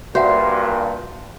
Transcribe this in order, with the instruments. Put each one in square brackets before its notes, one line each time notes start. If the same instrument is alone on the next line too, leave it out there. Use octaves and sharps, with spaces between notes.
[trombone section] G2 A#2 [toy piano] F#4 E5 F#5 [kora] C5